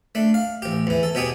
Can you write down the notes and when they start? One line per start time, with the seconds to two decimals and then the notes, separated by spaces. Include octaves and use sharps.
0.15 A3 D4
0.34 F5
0.62 A1 G4
0.87 E2 E3
1.03 A4
1.15 B2 B3 G4 G#4